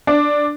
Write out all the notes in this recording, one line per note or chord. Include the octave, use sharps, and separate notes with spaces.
D4